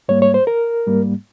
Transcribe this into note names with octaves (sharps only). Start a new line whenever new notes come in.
G#2 G3 A#3 C#5
C#5
C5
A#4
G#2 G3 A#3